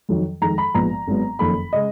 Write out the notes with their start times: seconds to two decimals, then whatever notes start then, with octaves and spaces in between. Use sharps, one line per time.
0.09 F2 D#3 F#3
0.41 F2 D#3 G#3 A#5
0.58 B5
0.74 A#1 G#2 F3 B3 A#5
1.08 G#1 G#2 F#3 B3
1.39 F#1 F2 D#3 A#3 C#4 B5
1.73 C#3 G#3 D#5